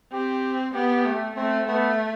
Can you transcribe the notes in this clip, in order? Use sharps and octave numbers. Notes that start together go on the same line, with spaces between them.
C4 G4
B3 G4
A3
A3 C4
A3 B3